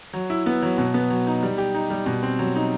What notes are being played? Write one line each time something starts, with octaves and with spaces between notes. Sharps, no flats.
F#3
E4
B3
F#3
B2
B3
F#3
D#4
G3
G4
D#4
G3
B2
C4
F#3
D#4